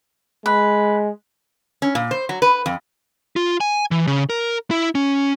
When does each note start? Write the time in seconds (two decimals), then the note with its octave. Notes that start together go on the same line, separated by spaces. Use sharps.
0.46 G#3 B4
1.82 C#4
1.95 A#2
2.11 C5
2.29 F#3
2.42 B4
2.66 F2
3.36 F4
3.60 G#5
3.91 E3
4.07 C#3
4.30 A#4
4.71 E4
4.95 C#4